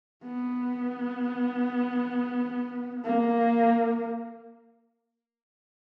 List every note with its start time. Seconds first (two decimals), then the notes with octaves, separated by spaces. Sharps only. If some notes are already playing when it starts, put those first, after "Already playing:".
0.24 B3
3.05 A#3